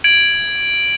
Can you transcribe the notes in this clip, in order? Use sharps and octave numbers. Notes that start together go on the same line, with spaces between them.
G#6 D7 F#7